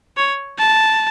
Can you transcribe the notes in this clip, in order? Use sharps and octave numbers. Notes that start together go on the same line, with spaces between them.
C#5
A5